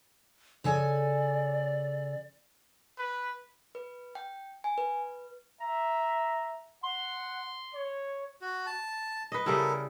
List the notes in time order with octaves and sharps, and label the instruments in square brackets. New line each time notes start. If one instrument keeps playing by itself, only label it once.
[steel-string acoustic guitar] C#3 A4 G#5 [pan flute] D5
[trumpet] B4
[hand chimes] B4
G5
G#5
B4
[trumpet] E5 [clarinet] A#5
[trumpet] F#5 [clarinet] C6
[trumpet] C#5
[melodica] F#4
A5
[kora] B4 D#5
[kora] C#3 G3 E4 [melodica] A4 A#4